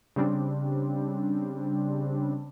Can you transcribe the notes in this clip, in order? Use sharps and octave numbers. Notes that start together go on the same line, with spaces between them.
C#3 G3 C4 D4